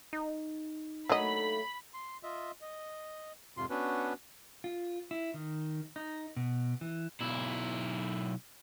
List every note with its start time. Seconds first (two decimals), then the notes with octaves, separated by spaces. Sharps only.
0.13 D#4
1.09 F#3 A3 A#3 D4 D#5 B5
1.94 C6
2.23 F4 D#5 E5
2.61 D#5
3.57 F2 G#2 C3 F4 C6
3.70 B3 C#4 D4 F#4 B4
4.64 F4
5.11 E4
5.34 D#3
5.96 D#4
6.36 B2
6.81 E3
7.21 B1 E4